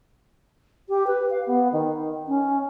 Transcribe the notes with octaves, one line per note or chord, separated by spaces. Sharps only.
G4
B4
F5
B3
D#3
C#4